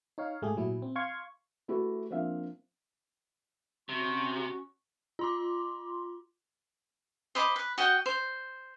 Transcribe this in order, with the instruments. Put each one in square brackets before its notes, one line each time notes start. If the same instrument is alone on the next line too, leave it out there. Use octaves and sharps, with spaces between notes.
[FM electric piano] D#4 C#5 F5
G#2 A3 G4 G#4
A#2 F#3 E4
C4
F5 C6 C#6 G#6
[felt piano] A3 E4 F#4 G4 A4 B4
F3 A#3 C4 D4 E5 F5
[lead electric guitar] C3 [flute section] C#4 F#4 C#6
[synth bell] F4 C6 D6
[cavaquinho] C5 D#5 B5 D6
B4
F#4 D#5 F#5 G5
C5